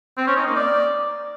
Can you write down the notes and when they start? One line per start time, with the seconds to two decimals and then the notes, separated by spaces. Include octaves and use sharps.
0.17 C4
0.27 C#4
0.37 D#4
0.46 A#3
0.56 D5